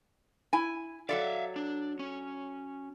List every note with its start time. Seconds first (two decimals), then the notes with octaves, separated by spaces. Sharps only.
0.53 E4 G#5
1.09 F#3 A4 D5 E5 F5
1.56 D4
1.99 C#4